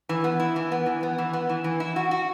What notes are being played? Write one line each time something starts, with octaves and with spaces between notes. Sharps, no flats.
E3
B3
E4
E3
B3
E3
B3
E3
B3
E3
E3
E4
F#4
F#4